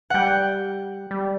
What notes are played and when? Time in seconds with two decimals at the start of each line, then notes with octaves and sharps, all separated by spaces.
0.10 G3 F#5 G5
1.11 G3